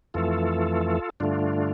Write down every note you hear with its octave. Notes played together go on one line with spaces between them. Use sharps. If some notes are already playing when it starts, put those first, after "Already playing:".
F2 E3 A3 F4 A4
G2 D3 A3 D4 F4